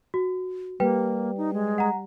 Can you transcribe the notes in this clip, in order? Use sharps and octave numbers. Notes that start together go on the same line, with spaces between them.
F#4
G3 A#3 G4 B4 G5
D#4
G#3
F#5 A#5